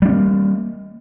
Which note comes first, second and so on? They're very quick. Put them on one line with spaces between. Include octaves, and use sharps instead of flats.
G3 D4 C#4 A#3